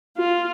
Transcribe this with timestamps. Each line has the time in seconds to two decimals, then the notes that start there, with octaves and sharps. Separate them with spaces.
0.17 F4